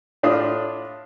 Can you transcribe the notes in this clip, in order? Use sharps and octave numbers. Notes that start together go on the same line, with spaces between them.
A2 D4 F4 F5 D#6